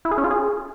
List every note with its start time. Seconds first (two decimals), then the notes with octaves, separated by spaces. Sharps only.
0.05 E4
0.11 G#4
0.18 C#4
0.24 F4
0.31 G#4